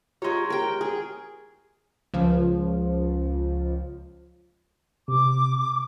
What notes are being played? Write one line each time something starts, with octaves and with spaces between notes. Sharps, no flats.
G#3 F4 G4 C#5 A#5
G4 A#4 G5
G#4
C#2 F3
C3 D6